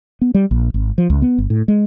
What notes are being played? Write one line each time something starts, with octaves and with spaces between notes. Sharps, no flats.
B3
G3
A#1
G#1
F3
C#2
B3
G1
A2
G#3